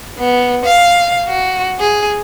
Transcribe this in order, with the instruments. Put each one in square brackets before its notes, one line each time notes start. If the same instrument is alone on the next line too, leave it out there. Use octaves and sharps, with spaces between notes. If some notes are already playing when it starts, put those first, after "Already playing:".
[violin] B3
F5
F#4
G#4